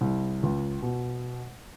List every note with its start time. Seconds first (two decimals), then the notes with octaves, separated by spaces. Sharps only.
0.01 C2
0.43 C#2
0.82 B2